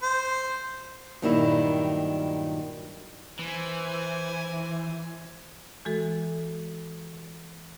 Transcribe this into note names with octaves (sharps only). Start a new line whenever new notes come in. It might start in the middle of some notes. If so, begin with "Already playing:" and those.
C5
G2 A#2 D#3 F#3 G3 E4
E3 C5 G#5
E3 G#3 F#4 A4